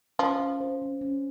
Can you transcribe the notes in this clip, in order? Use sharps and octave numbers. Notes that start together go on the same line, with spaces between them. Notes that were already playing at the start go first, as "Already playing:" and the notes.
F3 C#4
C#4
C5
C#4
C#4